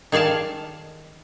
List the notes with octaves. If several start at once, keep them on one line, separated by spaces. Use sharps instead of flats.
D#3 G#4 D5 F5 A5